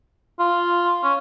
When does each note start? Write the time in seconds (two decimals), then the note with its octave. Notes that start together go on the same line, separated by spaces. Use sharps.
0.40 F4
1.03 C#4